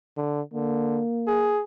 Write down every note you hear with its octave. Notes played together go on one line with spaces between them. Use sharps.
D3
D3 A#3
G#4